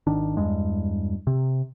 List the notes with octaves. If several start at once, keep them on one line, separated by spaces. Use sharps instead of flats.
G#1 D#3 D4
E2 G2 G#3
C3